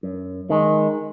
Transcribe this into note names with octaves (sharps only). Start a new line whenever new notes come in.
F#2
D#3 G#3